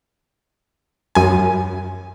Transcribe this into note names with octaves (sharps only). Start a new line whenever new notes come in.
F#2 G#5